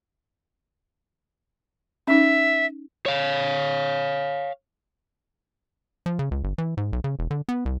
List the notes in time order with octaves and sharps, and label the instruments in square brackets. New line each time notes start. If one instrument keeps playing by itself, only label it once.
[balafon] C#4 D#4 [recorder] E5
[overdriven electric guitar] C#5 F5
[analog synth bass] F3
C#3
C#2
G1
E3
G#2
B1
C#3
E1
D3
B3
C2